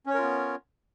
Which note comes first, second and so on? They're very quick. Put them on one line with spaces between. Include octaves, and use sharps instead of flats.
C#4 C#5 A#4 F4 B3